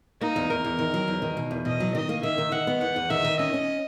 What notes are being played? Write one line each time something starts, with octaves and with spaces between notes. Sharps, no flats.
A#3 D#4
E2
E2 A#4
E2
D#3
F#3
E2
D#3
B2
E2
B2 D#5
F#3
D#3 D#5
A#3
D#3 E5
D#3
D#3 F#5
B3
E2 F#5
E2
D#3 E5
D#3
C#4 D#5
C#4